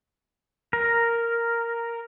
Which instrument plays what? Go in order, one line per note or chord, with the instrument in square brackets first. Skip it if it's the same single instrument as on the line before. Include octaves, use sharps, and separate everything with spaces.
[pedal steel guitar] A#4